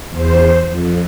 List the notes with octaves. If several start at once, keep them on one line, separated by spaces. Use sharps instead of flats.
E2 C5
F2